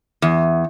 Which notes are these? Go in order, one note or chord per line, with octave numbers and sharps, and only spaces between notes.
E2